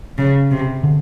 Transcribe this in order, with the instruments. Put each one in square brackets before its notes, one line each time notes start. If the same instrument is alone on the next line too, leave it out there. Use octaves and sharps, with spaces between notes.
[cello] C#3
C3
[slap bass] D3